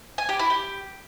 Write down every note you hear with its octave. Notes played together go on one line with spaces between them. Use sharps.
G#5
G4
E4
G4